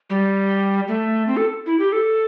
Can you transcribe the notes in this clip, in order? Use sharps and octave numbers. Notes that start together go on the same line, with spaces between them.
G3
A3
C4
A4
E4
G4
A4